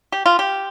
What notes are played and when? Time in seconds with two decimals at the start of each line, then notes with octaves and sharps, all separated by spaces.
0.12 G4
0.26 F4
0.39 G4